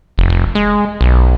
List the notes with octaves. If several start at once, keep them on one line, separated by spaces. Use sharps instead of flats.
F1
F1
G#3
B1